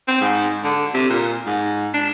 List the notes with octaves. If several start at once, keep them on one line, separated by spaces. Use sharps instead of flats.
C4
G#2
D3
C3
A#2
G#2
D4